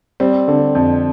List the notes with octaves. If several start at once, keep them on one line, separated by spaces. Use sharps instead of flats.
G3 C4
D3
F2